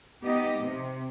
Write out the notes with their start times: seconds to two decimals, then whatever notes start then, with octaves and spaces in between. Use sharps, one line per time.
0.24 B3 D#4 G4 D#5
0.60 C3